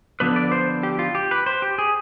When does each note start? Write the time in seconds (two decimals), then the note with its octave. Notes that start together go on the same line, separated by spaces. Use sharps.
0.20 D3 F3 B3 D4 B4
0.36 D5
0.52 C5
0.83 G4
0.99 F4
1.15 G4
1.31 B4
1.46 C5
1.62 G4
1.78 G#4